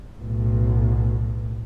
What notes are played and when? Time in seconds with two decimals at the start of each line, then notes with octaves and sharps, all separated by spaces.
0.18 B1 A2